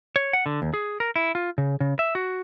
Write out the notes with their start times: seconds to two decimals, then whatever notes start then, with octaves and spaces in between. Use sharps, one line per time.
0.16 C#5
0.33 F#5
0.46 D3
0.62 D#2
0.74 G#4
1.00 A#4
1.16 E4
1.35 F4
1.58 C#3
1.80 C#3
1.99 E5
2.15 F#4